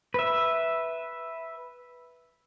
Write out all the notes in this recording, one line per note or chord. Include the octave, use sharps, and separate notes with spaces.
B4 E5